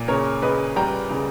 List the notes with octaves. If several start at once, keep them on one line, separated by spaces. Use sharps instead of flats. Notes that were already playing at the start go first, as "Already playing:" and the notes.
Already playing: A#2
C#3 A#4 C#5
C#3 B4 D#5
G3 G5 A#5
C#3